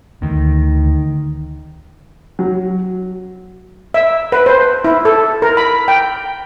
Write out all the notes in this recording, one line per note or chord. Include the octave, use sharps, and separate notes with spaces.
D2 D#3
F#3
E5
B4
C5
E4
A4
A#4
B5
G5